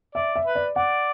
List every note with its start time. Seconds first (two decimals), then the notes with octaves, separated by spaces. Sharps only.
0.15 D5 E5
0.36 E5
0.45 B4
0.55 D5
0.76 D5 F#5